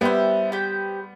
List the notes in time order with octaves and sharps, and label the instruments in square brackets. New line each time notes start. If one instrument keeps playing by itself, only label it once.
[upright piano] G3 B3 [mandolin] E4 G4 C5
[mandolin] G4 C5 G5